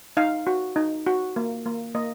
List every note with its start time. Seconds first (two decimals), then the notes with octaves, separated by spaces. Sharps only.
0.17 D#4 F5
0.47 F#4
0.76 D#4
1.07 F#4
1.36 A#3
1.66 A#3
1.95 A#3 D#5